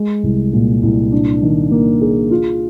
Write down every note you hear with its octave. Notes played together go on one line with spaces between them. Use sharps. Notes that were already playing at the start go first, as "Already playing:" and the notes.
Already playing: G#3
C2
A#2
C2
D4
D#3
A#3
G#4
F4